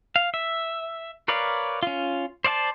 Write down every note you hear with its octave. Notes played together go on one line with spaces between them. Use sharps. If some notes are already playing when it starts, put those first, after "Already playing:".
F5
E5
A#4 B4 C#5 D5 F5
C#4 F4
C5 D5 F5 A5